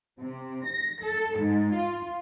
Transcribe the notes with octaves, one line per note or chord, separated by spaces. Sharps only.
C3
A#6
A4
G#2
F4